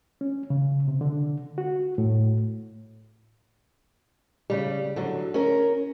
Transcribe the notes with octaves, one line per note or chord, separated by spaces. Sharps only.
C#4
C#3
C3
D3
F#4
A2
C#3 G3
D3 F#3
C#4 A#4